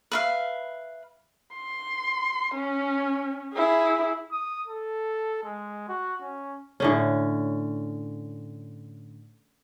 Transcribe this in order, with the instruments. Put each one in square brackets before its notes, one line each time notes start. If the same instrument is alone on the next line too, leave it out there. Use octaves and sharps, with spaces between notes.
[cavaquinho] B4 E5 F5
[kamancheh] C6
C#4
E4 G#4
[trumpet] D#6
A4
G#3
F#4
C#4
[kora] A2 D3 C#4